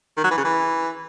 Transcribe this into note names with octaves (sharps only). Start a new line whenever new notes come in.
D#3
F#3
E3
C#3
E3